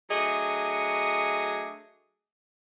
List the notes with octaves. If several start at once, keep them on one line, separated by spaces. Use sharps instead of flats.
F#3 A3 D4 G#4 D#5